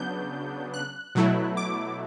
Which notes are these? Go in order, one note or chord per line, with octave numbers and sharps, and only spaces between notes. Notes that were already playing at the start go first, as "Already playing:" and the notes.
Already playing: C#3 F#3 B3 D4 G6
F#6
B2 F#3 A3 E4
D6